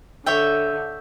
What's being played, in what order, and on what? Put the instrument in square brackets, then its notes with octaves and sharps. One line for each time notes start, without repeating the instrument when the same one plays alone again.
[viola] D3 [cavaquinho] C#5 E5 G5